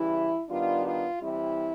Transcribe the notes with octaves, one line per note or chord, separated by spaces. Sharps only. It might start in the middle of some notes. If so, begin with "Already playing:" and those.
Already playing: C#3 E3 G3 E4
D#3 G3 B3 D4 F4
F4
E3 G3 C4 E4